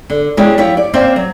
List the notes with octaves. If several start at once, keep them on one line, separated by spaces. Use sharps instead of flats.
D3
G#3 B3 C#4 D4 E4 G4
F3 E4 G4 C#5
D5
A#3 C4 C#4 C5 D5 E5
F#3